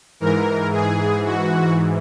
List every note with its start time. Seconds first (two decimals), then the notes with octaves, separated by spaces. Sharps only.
0.20 G#2 E3 A#4
0.72 G#4
1.24 F#4